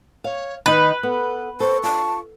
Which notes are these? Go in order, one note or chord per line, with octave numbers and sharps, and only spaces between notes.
C#5 F5
D#3 D#4 B4 B5
B3 A4
A4 C5 C#6
F4 A5